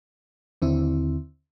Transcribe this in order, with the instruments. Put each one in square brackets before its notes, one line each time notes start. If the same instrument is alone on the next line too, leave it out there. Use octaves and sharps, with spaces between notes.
[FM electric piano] D#2 D3 C4 E4